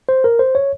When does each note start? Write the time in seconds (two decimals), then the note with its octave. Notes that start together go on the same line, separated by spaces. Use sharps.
0.09 C5
0.24 A#4
0.39 C5
0.55 C#5